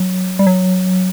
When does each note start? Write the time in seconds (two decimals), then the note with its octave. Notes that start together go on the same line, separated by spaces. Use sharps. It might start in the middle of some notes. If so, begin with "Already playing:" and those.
Already playing: F#3
0.39 G3
0.47 F#3